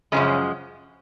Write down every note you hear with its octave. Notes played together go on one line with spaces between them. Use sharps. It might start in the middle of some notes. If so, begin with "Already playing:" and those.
F#2 C#3 F3 G#3 C#4